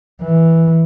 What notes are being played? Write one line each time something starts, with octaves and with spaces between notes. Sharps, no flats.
E3